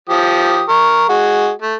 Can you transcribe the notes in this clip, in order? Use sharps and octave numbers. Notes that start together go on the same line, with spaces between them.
F3 G4 D#6
A#4 C#6
G#3 F#4
A3